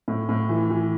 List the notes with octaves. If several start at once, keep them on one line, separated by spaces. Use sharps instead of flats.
A2
A2
E3
E3